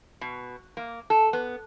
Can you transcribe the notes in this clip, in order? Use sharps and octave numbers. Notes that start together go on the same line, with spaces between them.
B2
A#3
A4
B3